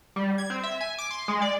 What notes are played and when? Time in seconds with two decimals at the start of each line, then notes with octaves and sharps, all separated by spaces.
0.16 G3
0.38 G#6
0.50 C4
0.63 E5
0.81 G#5
0.99 D6
1.11 C6
1.28 G#3
1.42 D5